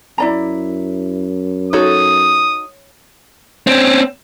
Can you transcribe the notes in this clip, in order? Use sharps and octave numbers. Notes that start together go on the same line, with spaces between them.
F#2 E4 D5 A#5
D#4 F#4 A4 C#5 D#6
C4 C#4